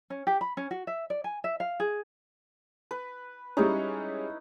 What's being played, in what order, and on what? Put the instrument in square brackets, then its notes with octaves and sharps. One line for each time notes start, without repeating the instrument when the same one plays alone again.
[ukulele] C#4
G4
B5
C#4
F#4
E5
D5
G#5
E5
F5
G#4
[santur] B4
[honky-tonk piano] G3 G#3 C#4 [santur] D#4 E4 C#5